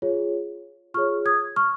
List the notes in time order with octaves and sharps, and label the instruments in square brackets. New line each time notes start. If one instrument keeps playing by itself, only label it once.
[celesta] F4 G#4 C#5
F4 G#4 C#5 C#6 F6
D#6 G#6
C#6 F6